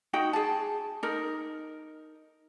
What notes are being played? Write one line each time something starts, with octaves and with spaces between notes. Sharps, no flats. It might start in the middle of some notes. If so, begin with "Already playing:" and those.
D#4 F#4 G5
G#4 A5
D#4 A#4